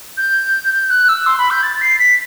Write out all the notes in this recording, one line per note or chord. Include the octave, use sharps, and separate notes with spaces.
G6
F#6
E6
C6
B5
G6
A6
C7
B6